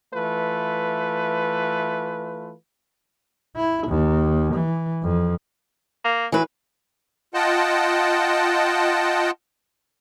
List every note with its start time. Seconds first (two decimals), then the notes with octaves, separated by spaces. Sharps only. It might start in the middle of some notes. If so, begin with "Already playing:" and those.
0.14 E3 A3 F4 B4
3.56 E4
3.87 D#2
4.54 E3
5.03 F2
6.04 A#3
6.32 E3 F#3 B4
7.34 F4 D#5 F#5 G5 A5